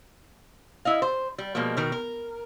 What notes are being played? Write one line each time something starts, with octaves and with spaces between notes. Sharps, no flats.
E4 D#5 F5
C5
G3
B2 F3 G3 G#3 A#3
B2 D#3 A#4
A#4